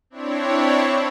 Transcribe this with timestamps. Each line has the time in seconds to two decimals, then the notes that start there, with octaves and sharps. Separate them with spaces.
0.10 C4 D4 E4 C#5